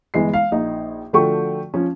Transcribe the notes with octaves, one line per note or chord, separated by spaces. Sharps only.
G1 E3 G#3 C7
F5
A#1 D#4
D3 F3 A3 F#4 G5 C#6
F3 C#4